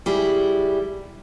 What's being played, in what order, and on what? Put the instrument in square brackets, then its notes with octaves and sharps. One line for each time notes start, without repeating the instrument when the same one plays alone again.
[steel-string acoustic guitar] G3 E4 G#4